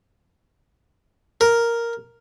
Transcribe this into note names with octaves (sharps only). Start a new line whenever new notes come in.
A#4